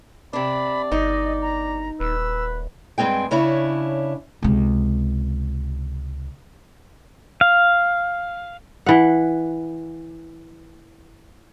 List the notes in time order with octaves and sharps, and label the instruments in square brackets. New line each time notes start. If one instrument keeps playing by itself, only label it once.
[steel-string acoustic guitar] C3 D4 [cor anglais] D5 [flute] B5
[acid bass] G1 [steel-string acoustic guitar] D#4 [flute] D#5
[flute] A#5
[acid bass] D#1 [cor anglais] B4 [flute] E6
[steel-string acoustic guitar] G2 G#3 C4 G#4 G5
C#3 C#4 D4 E4 C#5
[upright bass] C#2 C3
[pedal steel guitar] F5
[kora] E3 F#5